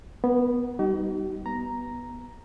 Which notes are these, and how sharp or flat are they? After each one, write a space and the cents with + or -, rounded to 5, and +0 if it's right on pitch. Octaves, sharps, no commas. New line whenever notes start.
B3 +0 A#4 +45
G3 +0 D#4 +5 F#4 +45
B3 -10 A#5 +0